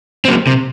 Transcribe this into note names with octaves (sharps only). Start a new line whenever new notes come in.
C4
F#3 A#3
C3